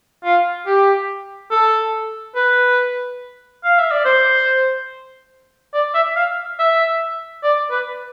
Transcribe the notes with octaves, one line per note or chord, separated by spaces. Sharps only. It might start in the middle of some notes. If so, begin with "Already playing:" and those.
F4
G4
A4
B4
F5
E5
D5
C5
D5
E5
F5
E5
D5
B4